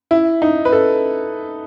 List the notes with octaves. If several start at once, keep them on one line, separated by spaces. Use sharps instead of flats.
E4
D#4
B4
A4